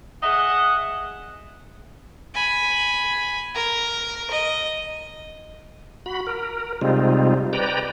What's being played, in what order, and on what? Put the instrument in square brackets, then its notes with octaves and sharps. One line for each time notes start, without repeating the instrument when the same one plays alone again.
[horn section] G#4 D#5 E5 F#5
[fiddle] G#5 B5
A#4 A#5
D#5
[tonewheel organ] F#4 B5
A#4
C3 G3 G#3 C4 D#4 F4
B4 D5 G5 A#5